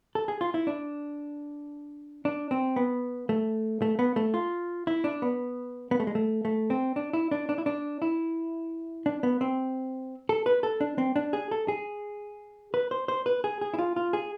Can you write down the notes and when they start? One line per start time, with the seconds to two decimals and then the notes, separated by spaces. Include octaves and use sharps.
0.15 A4
0.28 G#4
0.41 F4
0.54 E4
0.67 D4
2.25 D4
2.51 C4
2.76 B3
3.29 A3
3.82 A3
3.99 B3
4.16 A3
4.34 F4
4.87 E4
5.04 D4
5.22 B3
5.91 B3
6.00 A3
6.07 G#3
6.15 A3
6.45 A3
6.70 C4
6.96 D4
7.13 E4
7.31 D4
7.49 D4
7.58 E4
7.66 D4
8.02 E4
9.06 D4
9.23 B3
9.41 C4
10.29 A4
10.46 B4
10.63 A4
10.81 D4
10.98 C4
11.16 D4
11.33 G#4
11.51 A4
11.68 G#4
12.74 B4
12.91 C5
13.08 C5
13.26 B4
13.44 G#4
13.61 G#4
13.74 E4
13.79 F4
13.96 F4
14.13 G#4